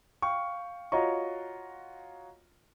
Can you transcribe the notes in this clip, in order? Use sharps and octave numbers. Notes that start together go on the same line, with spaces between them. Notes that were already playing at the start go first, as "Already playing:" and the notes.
F5 G5 C#6
F4 F#4 C#5 D#5 A#5 C#6